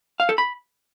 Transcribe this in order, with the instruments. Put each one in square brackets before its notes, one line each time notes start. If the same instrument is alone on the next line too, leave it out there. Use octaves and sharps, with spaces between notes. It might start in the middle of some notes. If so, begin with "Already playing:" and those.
[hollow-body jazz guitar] F5
A4
B5